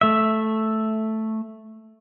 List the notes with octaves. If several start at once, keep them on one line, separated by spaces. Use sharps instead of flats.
A3 E5